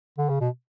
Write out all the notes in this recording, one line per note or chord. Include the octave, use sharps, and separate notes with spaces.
D3
C#3
B2